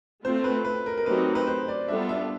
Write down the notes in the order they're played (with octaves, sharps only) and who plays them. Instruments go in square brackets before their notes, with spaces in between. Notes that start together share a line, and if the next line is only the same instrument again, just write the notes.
[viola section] A3 C4 F4 [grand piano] C5
[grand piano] B4
B4
A#4
A#4
[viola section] F#3 A3 C4 D#4 G4 [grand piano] B4
[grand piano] B4
C5
D5
[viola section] G3 B3 D4 F4 A4 [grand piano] E5
[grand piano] E5